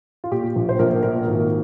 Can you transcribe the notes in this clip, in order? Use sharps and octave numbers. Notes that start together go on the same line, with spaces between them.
F4
A#2 G4
A#1
C5
A#1 A#4
A#2 A#4
G#1